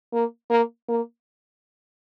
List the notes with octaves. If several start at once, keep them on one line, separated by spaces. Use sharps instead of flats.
A#3
A#3
A#3